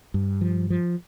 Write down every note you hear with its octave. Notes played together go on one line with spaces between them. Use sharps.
G2
F3
F3